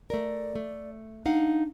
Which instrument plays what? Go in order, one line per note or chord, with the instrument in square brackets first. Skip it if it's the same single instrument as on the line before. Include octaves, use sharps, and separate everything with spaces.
[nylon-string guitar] A3 A#4 [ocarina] D5
[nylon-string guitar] A3
[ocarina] D4 [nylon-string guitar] D#4 F5 F#5